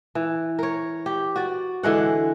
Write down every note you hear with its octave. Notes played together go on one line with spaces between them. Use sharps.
E3
A#4 C#5
G4
F#4 D5
D3 E3 G#3 F#5